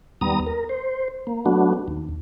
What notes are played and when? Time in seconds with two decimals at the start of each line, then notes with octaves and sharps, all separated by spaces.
0.21 D#2 G3 B3 A#5 D#6
0.47 A#4
0.69 C5
1.27 A#3
1.46 F#3 A3 B3 D4 F#4
1.88 D#2